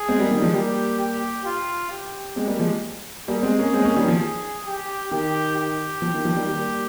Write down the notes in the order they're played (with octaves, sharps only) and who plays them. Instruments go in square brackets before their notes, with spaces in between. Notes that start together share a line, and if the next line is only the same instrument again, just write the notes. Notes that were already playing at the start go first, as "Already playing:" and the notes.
Already playing: [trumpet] G#4
[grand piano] G#3 C4
G3 A#3
D#3 G3
F3 G#3
[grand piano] G3 A#3 [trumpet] G4
[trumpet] G4
F4
G4
[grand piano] G#3 C4
G3 A#3
F3 G#3
[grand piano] G3 A#3 [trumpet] G#4
[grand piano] G#3 C4
A#3 C#4
G#3 C4
A#3 C#4
D#3 G3
F3
[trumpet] G#4
G4
[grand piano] D#3 [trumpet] G4
[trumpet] G4
[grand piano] F3
D#3
F3
D#3 G3
G3 A#3